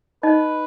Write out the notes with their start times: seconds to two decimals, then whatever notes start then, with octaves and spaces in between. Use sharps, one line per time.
0.23 D#4 B4 D#5